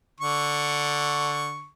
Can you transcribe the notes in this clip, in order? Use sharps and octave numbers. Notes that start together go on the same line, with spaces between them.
D3 C#6